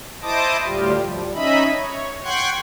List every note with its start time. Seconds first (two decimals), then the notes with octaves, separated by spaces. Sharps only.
0.22 E4 C5 D#5 A5 D6 D#6
0.65 D2 A2 G3 F4 G4
1.02 F3 G3
1.35 C#4 D#4 D#5 E5 B5
1.80 C#5
2.24 F#5 G5 C6 C#6 F#6 G#6